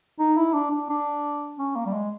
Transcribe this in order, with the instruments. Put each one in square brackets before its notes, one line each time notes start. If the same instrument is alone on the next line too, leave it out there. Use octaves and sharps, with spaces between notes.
[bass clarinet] D#4
E4
D4
D4
D4
C#4
A#3
G3
G#3